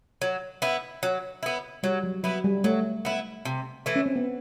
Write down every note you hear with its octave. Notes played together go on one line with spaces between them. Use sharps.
F#3
B3 E4
F#3
B3 E4
F#3 G3
F#3
F#3 B3 E4
G3
F#3 A3
B3 E4
C3
E3 A3
C#4
C4
B3